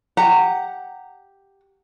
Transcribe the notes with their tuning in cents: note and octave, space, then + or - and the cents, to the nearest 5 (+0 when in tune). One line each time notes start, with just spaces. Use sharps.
G4 +0 F#5 +0 A#5 -25